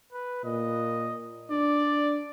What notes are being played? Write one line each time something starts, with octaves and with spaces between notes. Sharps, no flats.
B4
A#2 D#5
D4 D5